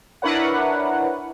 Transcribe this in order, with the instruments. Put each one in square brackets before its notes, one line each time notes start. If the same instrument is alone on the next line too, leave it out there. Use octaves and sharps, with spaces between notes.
[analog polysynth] D4 E4 A#4 B4 C#5 F#5